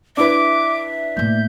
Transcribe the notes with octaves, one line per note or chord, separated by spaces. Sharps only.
D4 E4 B4 E5 D6
A2 A#3 G6